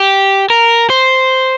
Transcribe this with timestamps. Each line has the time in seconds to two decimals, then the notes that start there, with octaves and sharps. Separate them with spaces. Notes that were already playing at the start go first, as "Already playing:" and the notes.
Already playing: G4
0.50 A#4
0.90 C5